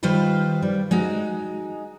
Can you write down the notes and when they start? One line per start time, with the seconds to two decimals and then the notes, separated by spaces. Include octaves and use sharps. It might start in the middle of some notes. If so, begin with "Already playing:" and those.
0.03 D#3 G3 F4 B4 C5
0.62 G3
0.91 G#3 D#4 F#4